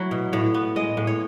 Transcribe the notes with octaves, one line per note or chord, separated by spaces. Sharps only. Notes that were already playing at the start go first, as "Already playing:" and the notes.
Already playing: F#3 A3 E4 F#4
B2
A2 C#5
B3
G#3 D#5
A2
C#5